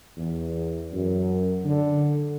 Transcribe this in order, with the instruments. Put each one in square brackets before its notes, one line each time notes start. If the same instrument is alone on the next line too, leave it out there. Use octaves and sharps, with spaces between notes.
[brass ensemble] E2
F#2
D3